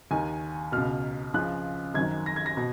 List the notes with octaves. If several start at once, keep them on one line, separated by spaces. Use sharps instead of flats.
D#2 D#3 G#5
C#2 B2 F6
C#2 C#3 F3 F#6
G#1 F#2 D#3 G#6
A#6
G#6
A#6
B2